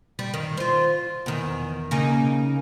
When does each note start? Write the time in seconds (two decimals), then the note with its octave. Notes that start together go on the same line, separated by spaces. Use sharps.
0.19 G3
0.34 D#3
0.57 F4 C5
1.26 E2 D#3
1.91 C#3 A#3 D#4